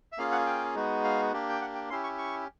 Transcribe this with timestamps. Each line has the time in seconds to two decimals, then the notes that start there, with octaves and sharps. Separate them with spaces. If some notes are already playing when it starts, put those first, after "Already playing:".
0.12 E5
0.18 A#3 C#4 F4 G#4 F5
0.32 F#5
0.46 G5
0.75 G#3 B3 D#4 F#4
1.04 F5
1.33 A#3 D4 G4
1.49 G5
1.61 F#5
1.75 G5
1.90 C#4 E4 G4 C6
2.04 C#6
2.18 C#6